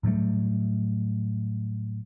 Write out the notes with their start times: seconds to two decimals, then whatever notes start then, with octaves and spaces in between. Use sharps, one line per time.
0.03 A2 F#3 G3 A3